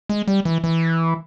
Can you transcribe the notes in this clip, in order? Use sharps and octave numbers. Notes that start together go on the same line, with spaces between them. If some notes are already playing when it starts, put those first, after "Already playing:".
G#3
G3
E3
E3